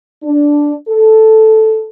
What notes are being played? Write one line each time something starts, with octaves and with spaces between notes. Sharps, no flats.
D4
A4